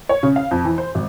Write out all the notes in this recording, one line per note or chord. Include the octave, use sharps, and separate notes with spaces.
C#5
C#3
F5
F2
E3
C5
G#1